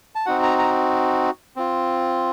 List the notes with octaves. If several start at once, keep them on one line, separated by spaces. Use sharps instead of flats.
A5
C4 D#4 F#4 F#5
A#5
A#5
C4 F4